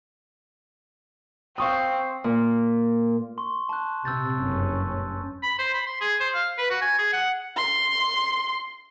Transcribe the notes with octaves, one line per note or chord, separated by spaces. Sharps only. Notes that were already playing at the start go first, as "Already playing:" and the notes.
C4 F5 C#6 D#6
A#2
C6 C#6
A5 F#6
C3 E6 G6 A6
F#1 G2 C#4
B5
C5
B5
C6
G#4
C5
F5
B4
F#4
G#5
G#4
F#5
C6